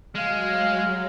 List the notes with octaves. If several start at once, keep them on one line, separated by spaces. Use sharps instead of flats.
F#3 G#3 F5 F6